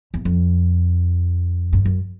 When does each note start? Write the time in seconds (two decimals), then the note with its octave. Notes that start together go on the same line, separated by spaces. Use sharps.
0.14 E2
0.25 F2
1.73 G2
1.85 F#2